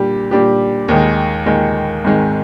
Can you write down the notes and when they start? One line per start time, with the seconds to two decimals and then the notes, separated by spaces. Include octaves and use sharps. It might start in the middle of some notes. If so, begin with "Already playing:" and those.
Already playing: A#2 G3 D4 G4
0.31 A#2 G3 D4 G4
0.88 D#2 D#3 G#3
1.46 D#2 D#3 G#3
2.04 G#1 G#2 D#3 G#3